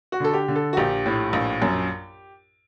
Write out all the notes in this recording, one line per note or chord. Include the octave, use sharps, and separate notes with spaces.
F#4
D3 A4
G4
D3
A4
F#4
A#1 G4
A2
A#1
F#2